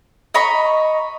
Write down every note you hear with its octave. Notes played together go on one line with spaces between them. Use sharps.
D#5 A#5 B5 C#6